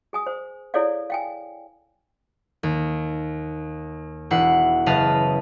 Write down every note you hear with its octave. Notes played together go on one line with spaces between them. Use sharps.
G#4 G#5 D#6
C5
E4 G#4 A4 C#5 D5 F5
F5 G5 G#5
D#2
E1 E4 F#5 C7
F#1 C#3 B4 D#5 F5 A5